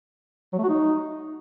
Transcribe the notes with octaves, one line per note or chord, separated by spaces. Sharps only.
F#3
A3
F#4
D#4